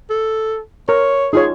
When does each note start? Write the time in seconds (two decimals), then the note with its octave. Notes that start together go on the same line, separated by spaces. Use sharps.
0.10 A4
0.89 A#4 C#5
1.33 D#4 F4 G#4 C#5